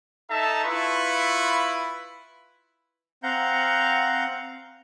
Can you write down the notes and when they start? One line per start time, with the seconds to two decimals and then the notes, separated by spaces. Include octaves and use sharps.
0.30 D#4 A4 E5 A5 A#5
0.65 E4 F4 B4 B5 C#6
3.23 C4 F5 F#5 A#5 G6